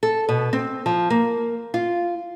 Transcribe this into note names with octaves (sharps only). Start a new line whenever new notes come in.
A4
B2
C4
F3
A#3
F4